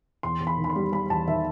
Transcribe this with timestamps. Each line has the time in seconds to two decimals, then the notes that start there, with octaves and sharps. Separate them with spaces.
0.23 E2 C6
0.41 E2
0.47 B5
0.58 D#3
0.64 B5
0.70 C6
0.76 G3
0.92 G3 B5
1.10 E2 A5
1.27 D#3 E5